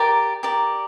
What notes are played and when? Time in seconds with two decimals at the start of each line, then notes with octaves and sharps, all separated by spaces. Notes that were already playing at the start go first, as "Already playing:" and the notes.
Already playing: G4 A#4 D5 D6
0.43 G4 A#4 D5